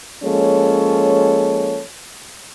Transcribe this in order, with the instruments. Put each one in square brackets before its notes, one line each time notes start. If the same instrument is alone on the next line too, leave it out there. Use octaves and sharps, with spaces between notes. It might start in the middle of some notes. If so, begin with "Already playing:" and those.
[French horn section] F3 G#3 A#3 C#4 A4 C#5